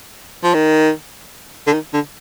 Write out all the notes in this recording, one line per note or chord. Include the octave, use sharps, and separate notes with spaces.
F3
D#3
D3
D#3
D3